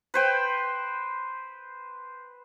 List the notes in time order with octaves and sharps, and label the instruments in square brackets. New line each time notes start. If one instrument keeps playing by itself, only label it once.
[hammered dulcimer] B4 C5 G5